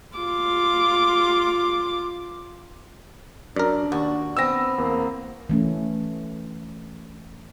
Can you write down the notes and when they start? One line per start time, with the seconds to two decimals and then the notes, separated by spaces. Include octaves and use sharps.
0.17 F4 D6
3.56 F#2 D4 A#4 D5
3.92 D#2 F#4
4.37 B3 C4 E6 A#6
4.78 E2 A#3
5.50 E3 A3 C#4